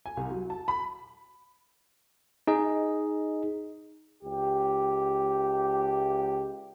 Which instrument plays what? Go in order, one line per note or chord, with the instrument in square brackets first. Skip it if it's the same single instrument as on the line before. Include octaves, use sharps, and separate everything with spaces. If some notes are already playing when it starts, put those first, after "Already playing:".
[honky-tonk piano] G#5
C2
F#3
A5
B5
[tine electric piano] D#4 G#4 D#5
[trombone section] C#2 G4